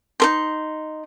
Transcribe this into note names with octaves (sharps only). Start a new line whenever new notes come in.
D#4 A#4 C6